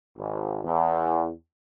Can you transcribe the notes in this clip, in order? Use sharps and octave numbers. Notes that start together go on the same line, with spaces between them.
G#1
E2